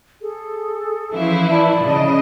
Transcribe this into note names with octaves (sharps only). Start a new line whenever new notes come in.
G#4 A4
E3 F3 C#4 E4 F5
D5 A5 B5
C#3 D#5